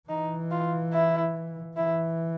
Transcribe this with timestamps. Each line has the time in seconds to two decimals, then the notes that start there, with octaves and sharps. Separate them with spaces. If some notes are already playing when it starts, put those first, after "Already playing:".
0.09 E3 D#4
0.51 F4
0.93 E4
1.77 E3 E4